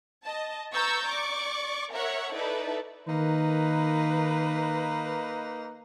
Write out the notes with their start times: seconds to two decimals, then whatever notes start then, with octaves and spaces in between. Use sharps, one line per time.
0.24 D#5 A5
0.73 B4 A#5 C#6 E6 G6 A6
1.05 D5 C#6 D6
1.91 A#4 C#5 E5 F#5 C#6
2.34 D#4 E4 A4 B4 D5 E5
3.08 D#3 A#3 D#4 B4